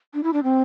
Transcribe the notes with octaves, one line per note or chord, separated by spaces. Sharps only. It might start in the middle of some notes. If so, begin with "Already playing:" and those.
D4
E4
D4
C4